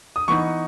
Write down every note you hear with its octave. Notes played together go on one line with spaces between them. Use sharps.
D#6
E3 B3 D#4 C#6